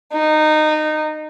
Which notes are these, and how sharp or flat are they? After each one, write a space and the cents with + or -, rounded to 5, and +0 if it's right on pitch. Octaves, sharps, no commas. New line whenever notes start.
D#4 -20